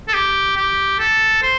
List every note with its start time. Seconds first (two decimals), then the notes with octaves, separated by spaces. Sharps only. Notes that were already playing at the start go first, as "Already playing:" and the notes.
0.08 A4
0.14 G4
0.56 G4
0.99 A4
1.42 C5